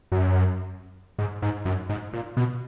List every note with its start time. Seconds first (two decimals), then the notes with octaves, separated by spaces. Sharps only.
0.12 F#2
1.19 G#2
1.42 G#2
1.65 F#2
1.89 G#2
2.13 A#2
2.37 B2